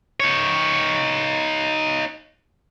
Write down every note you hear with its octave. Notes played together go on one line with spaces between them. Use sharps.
D#4 C#5